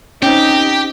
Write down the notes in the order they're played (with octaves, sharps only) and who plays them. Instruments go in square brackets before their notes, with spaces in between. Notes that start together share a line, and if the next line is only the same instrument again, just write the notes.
[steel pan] C4 C#4 [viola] D#4 [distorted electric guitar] G4 [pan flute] G5